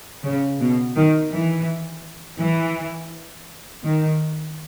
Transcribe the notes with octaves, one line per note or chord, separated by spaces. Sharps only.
C#3
B2
D#3
E3
E3
D#3